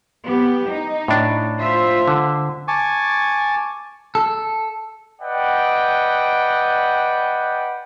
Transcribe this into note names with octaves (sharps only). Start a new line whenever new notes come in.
B3 G4
D#4
A2 D4
F4 C5 E5
D3
G#5 A5 C#6 D6
A4
B4 D5 D#5 F#5 G5